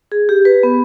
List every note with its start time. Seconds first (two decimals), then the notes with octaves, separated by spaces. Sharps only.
0.12 G#4
0.29 G4
0.45 B4
0.63 B3